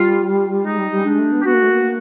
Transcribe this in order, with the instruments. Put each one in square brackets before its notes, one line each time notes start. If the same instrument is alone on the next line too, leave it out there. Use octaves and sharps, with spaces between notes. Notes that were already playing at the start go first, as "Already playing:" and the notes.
Already playing: [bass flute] G3 [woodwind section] F4
[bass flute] G#3 [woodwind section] D#4
[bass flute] G3
G3
[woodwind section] C#4
[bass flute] G#3 [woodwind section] D4
[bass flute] A3
B3
[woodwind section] G4
[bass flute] B3 [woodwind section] F#4
[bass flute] A#3
A3
A#3